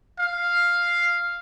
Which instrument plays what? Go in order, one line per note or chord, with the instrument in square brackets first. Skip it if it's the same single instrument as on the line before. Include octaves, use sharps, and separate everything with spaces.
[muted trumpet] F5